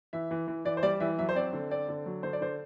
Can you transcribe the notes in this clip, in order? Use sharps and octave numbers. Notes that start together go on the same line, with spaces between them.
E3 E5
E3
E3
E3 D5
C5
G3 D5
E3 E5
F#3 E5
C5
C4 D5
D3
C4 D5
D3
F#3
D3 C5
D5
D3 C5